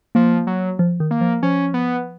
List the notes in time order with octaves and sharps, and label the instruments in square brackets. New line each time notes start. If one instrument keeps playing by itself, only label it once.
[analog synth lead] F3 [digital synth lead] A#3
[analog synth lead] F#3
[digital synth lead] F3
D#3
[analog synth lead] A#3
[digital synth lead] F3
[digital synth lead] F3 [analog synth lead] C#4
[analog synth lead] B3